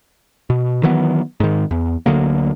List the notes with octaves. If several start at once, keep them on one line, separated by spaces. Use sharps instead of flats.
B2
D#3 E3 F#3 B3
G#2 D#3
E2
D2 D3 F#3 A#3